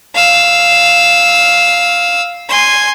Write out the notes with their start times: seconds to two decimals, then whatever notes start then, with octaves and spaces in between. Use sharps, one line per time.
0.15 F5 E6
2.49 G#5 C6